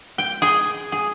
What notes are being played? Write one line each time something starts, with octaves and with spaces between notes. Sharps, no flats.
G5
G#4
G#4